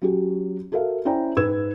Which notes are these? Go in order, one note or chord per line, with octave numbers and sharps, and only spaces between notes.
F#3 C#4 F#4 G4
F#4 A4 A#4 E5 F5
C#4 E4 C5 D5 G5 A#5
G#2 B4 E6 G#6 E7